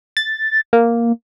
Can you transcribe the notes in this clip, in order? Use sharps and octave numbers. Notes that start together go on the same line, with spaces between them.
A6
A#3